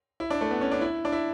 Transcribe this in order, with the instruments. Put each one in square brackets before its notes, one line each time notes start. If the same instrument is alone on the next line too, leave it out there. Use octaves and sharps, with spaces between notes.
[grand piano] E4
D4
A3
B3
C#4
D4
E4
D4
E4